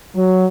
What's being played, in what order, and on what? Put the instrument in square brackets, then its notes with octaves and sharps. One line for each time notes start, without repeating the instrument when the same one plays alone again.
[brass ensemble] F#3